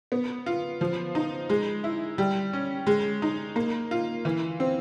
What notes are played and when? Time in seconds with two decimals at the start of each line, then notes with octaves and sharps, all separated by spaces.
0.12 B3
0.46 F4
0.81 F3
1.15 D#4
1.49 G#3
1.84 E4
2.18 G3
2.53 C#4
2.87 G#3
3.22 D#4
3.56 A#3
3.91 F4
4.25 E3
4.60 C4